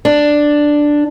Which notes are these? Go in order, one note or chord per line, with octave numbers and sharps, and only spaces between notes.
D4